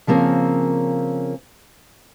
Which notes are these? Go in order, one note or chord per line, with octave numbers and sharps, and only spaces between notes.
C#3 F3 A#3 C4 C#4 A#4